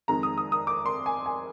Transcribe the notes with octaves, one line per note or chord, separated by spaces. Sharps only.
F2 D#3 G#3 A#5
D#6
D#6
D#6
D6
C6
G#5
G#5